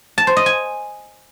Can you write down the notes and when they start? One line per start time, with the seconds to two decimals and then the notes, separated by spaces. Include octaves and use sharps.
0.18 A5
0.27 C5
0.37 D#5
0.46 G#5